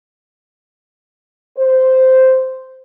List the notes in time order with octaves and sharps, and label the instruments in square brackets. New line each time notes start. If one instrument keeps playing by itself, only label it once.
[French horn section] C5